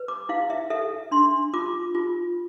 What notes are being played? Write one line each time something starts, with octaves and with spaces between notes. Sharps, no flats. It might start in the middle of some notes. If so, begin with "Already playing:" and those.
Already playing: B4
D6
E4 F5
E5
A4 E5
D4 C6
F4 D6
F4